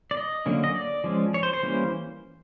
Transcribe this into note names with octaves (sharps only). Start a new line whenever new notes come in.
D5
D#5
D3 F#3 A#3 C#4
D#5
D5
F3 G#3 C#4
C#5
C5
C5
E3 G3 A#3 C#4